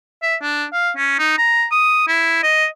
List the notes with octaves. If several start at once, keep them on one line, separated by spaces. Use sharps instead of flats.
E5
D4
F5
C#4
D#4
A#5
D#6
E4
D#5